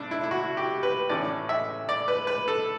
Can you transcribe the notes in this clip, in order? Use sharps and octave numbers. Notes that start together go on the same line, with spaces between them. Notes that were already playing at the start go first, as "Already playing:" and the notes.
Already playing: B1 D4
E4
E4
F#4
G4
B4
A1 A2 E3 A3 C#4 D5
E5
D5
B4
B4
A4